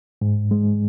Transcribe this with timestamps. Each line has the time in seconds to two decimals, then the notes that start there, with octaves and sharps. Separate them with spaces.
0.22 G#2
0.51 G#3